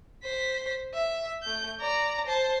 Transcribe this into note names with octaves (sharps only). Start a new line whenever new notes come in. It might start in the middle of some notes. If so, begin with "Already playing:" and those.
C5 B6
E5
A3 G6
D5 A#5
C5 A5